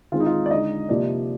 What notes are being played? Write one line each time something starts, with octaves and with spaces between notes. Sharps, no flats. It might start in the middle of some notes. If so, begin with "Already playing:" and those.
D#3 G#3 C4 F4
D#4
F4
D5
D3 G#3 D#4 D#5
C3 F3 A#3 D#4 D5